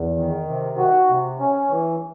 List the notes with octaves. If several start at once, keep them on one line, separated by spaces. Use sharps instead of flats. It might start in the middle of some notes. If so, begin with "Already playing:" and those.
Already playing: E2
D#3
C3
F#4
C3
C#4
E3